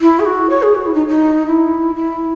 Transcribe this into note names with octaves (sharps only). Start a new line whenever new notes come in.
E4
G#4
F#4
C#5
G#4
F#4
E4
D#4
D#4
E4
E4